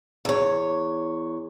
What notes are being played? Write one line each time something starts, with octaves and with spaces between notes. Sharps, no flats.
E2 C#5